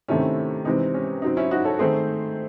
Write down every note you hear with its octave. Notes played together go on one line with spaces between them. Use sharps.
C3 D#3 A3 C4 C#4 E4
C3 E3 G#3 C4 D#4
C#4
C#3 F#3 C4 D#4
C#4 E4
D#4 F#4
A4 C#5
D#3 A3 C4 G#4 C5